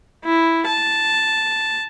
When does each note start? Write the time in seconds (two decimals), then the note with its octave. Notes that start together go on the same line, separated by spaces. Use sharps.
0.25 E4
0.66 A5